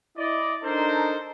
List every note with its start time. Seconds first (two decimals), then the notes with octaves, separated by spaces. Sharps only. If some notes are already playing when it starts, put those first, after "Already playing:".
0.17 E4 D5 D#5
0.64 D4 D#4 A4 A#4 C5